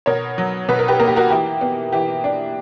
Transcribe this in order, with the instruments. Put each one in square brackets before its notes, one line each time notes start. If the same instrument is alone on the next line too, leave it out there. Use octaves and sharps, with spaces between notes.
[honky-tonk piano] B2 A#4 C#5
F#3
B2 B4
A#4
G4 B4
A#3 A#4
G4
F#4 A#4
E3 G4
B3
E3 G4
D4